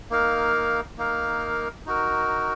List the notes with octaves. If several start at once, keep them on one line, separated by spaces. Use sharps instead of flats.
A#3 D#4 A#4 F5
A#3 D#4 A#4 F5
D#4 F#4 A#4